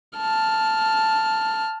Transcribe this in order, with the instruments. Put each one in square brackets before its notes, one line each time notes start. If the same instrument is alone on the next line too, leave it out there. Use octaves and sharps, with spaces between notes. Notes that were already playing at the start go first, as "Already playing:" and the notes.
[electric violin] A5 F6